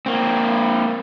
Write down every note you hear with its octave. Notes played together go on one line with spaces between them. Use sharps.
A#3 C4